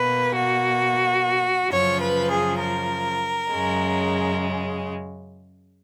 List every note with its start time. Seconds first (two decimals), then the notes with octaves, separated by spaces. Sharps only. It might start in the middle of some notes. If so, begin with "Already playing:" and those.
Already playing: B2 A#3 B4
0.36 F#4
1.70 F#2 C#3 F3 C#5
2.00 B4
2.29 G#4
2.59 A#4
3.50 F#2 C#3 G#3